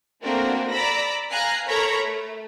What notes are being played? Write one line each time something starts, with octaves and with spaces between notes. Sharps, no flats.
A3 A#3 C4 D4 F#4 A#4
D5 A#5 B5 E6 A#6
F5 G#5 A#5 F#6 C7
A4 A#4 C#5 A#5 B5
A3